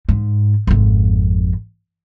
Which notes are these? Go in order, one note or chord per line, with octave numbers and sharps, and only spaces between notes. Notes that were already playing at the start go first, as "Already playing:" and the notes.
G#2
G#1 F2